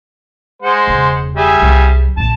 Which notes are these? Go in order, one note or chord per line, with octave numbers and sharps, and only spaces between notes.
G#3 C5 F#5
E1 C#3
G3 G#4 E5
C2 F#3
A#1 F#2 A5